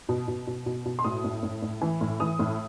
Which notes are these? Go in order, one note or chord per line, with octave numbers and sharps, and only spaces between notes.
B2
B2
B2
B2
B2
C6
A2 D#6
A2
A2
A2
E3
A2
E3 D#6
A2